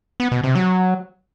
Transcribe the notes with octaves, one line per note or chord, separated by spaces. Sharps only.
B3
B2
C3
F#3